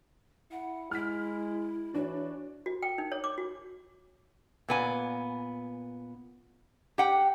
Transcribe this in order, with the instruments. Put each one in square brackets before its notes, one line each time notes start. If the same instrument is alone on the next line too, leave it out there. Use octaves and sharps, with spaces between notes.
[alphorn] E4 [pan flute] F#5
[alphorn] G#3 [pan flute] E4 [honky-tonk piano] F6 B6
[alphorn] E3 [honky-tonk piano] D4 C#5 [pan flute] F#4
[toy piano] F#4
G5
D#4
C#5
D6
F#4
[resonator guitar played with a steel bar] A#2 B3 G#5
G4 F#5 G5